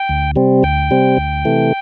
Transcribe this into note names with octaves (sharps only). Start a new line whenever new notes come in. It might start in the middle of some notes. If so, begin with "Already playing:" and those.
Already playing: G5
D2
C3 G3 C4
D2 G5
C3 G3 C4
D2
C3 E3 A3